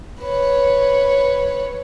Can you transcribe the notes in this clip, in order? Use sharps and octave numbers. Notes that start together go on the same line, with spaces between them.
B4 C#5